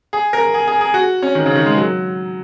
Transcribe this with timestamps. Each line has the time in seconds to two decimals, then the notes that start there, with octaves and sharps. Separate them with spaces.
0.13 G#4
0.33 A#4
0.54 G#4
0.67 G#4
0.81 G#4
0.94 F#4
1.22 C#4
1.35 D#3
1.46 C#3
1.55 D#3
1.66 G#3
1.77 F#3